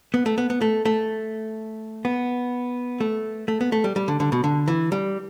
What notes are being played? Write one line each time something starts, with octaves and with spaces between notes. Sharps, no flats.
B3
A3
B3
B3
A3
A3
B3
A3
A3
B3
A3
G3
G3
D3
D3
B2
D3
E3
G3